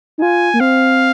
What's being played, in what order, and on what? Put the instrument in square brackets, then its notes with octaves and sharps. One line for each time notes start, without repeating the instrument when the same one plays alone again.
[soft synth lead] D#4
[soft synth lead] F4 [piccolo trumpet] G#5
[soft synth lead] A#3
[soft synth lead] C4 [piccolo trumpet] F5